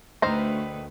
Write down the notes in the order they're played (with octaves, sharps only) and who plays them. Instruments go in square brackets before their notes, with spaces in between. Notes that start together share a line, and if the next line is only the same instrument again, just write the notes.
[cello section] D2 A3 B4 [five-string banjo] D#3 C5 A#5